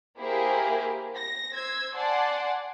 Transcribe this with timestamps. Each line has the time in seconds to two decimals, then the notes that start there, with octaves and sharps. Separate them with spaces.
0.20 A#3 E4 G4 G#4 A#4 C5
1.16 A#6
1.55 C5 E6 G#6
1.96 D5 F#5 G#5 A5 C6